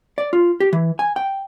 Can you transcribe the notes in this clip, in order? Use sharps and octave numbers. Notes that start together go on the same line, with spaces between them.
D5
F4
G4
E3
G#5
G5